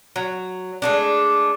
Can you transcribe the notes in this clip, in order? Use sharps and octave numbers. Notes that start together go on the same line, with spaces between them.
F#3
G#3 A3 D4